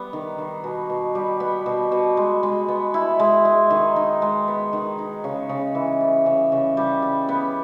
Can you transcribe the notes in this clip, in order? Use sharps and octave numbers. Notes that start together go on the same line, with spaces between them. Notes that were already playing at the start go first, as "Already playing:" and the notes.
Already playing: G3 B3
D#3
D#3
B2
B2
G3
B3
B2
B2
G#3
G#3
B3
E4
G#3
G#3
D#3
D#4
G#3
B3
D#3
D#4
C#3
C#3
E3
G3
C#3
C#3
G3
G3
B3